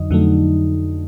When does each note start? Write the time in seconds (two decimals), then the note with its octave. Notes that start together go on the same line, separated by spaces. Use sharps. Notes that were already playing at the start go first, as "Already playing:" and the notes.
Already playing: F2 D3 F#3 D#4
0.10 F2 D3 F#3 A3